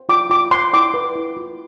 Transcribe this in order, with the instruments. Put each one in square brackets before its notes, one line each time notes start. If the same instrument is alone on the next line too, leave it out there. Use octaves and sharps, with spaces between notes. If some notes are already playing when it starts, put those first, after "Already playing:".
Already playing: [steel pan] C5
F4 D6
F4 D6
C5 C6
E4 D6
B4
E4
F4